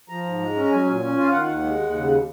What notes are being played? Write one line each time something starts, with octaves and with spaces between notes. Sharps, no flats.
F3 A#5
G#2
G#3
C#4
A#5
F#3 G#5
A#2
C#4
F4
F5
D#3 F#5
D#2 F#5
G#3
D#2
C#3 F#5